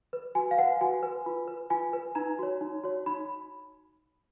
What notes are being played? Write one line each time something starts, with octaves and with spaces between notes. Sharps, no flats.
B4
F#4 G#5
F5
B4 F#5
F#4 G#5
B4
F4
B4
F4 G#5
B4
D#4 A#5
F#4 C#5
D#4
F#4 C#5
D#4 B5